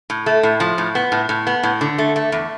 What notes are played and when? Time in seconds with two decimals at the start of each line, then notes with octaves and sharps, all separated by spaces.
0.10 A2
0.26 A3
0.43 A2
0.60 F3
0.78 A2
0.95 B3
1.12 A2
1.29 A2
1.47 B3
1.63 A2
1.81 D3
1.98 A3
2.16 A3
2.32 E2